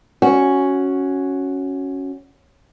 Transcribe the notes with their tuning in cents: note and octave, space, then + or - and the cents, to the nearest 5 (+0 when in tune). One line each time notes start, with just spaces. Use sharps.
C#4 +0 F#4 +0